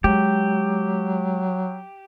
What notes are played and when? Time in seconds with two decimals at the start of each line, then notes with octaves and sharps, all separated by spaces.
0.04 F#3 G#3 G4